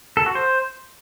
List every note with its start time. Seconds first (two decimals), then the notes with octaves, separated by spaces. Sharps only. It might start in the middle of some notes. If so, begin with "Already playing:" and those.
0.17 A4
0.26 F#4
0.35 C5